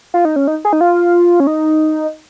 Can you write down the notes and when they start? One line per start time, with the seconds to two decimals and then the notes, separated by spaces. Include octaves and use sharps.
0.14 F4
0.25 D#4
0.36 C#4
0.47 D#4
0.65 G#4
0.73 D#4
0.81 F4
1.40 C#4
1.47 D#4